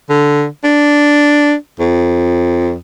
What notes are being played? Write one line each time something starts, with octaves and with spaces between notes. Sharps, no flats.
D3
D4
F2